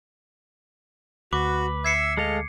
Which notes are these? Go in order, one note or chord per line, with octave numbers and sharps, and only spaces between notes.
D2 F#4 B4 D6
E5 E6 G#6 C7 C#7
G#3 A4 D#5 F5